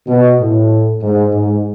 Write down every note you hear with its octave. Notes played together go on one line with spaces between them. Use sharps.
B2
A2
G#2
G#2